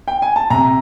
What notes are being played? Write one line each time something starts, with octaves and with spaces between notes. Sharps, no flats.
G5
G#5
A5
C3 A#5